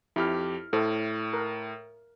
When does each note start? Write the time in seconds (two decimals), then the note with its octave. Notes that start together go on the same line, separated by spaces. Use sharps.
0.16 F2 E4 G4 F6
0.73 A2 A4 C5
1.33 A#4